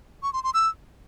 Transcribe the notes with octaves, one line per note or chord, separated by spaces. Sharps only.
C#6
C6
C6
E6